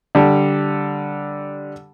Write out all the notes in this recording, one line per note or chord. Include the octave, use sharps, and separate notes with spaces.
D3 G3